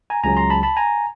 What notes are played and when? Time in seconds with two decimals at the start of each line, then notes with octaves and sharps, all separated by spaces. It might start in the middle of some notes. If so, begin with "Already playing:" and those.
0.10 G#5 A#5
0.23 C#2 C#3 F#3 G#5 A#5
0.37 A#5 C6
0.50 A5 B5
0.63 A5 B5
0.77 G#5 A#5